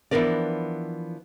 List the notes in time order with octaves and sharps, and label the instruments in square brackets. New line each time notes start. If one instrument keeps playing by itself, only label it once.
[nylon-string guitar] E3 F3 B3 D4 A#4 D5